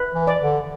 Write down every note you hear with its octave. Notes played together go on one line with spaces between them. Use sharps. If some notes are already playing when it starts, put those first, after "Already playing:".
Already playing: B4
E3
D5
D3